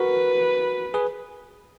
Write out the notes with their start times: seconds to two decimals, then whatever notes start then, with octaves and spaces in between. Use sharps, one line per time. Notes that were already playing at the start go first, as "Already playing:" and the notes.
Already playing: F#4 A#4 B4
0.94 G#4 B4